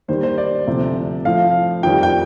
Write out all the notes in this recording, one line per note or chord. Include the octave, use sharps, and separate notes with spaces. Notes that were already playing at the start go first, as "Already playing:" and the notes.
D#2 D#3 G3 C5
C5
D5
D2 C3 F3
A2 F3 F5
F2 D#3 G3 G5
G5